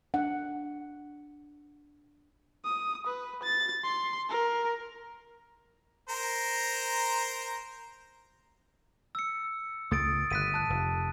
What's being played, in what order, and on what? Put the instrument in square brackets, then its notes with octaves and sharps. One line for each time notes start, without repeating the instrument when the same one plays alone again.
[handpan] D4 F#5
[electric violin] D#6
B4
A6
C6
A#4
[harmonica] A#4 C5 A#5
[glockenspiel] E6 C#7
[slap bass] C#2 A3 [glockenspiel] D#6 A6 D7
[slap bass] G1 [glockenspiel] F#6 B6 D#7
[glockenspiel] A5 F#6
[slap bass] F1